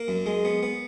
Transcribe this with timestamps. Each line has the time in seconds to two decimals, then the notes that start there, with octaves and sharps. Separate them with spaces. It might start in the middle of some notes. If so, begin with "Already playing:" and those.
Already playing: A#3 A#4
0.08 F#2
0.26 G#3
0.45 B3
0.63 B3